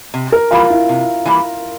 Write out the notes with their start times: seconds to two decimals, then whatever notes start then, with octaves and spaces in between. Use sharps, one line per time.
0.14 C3
0.32 A#4
0.51 E3 G3 A#3 F4
0.70 E4
0.89 C3
1.25 E3 G3 A#3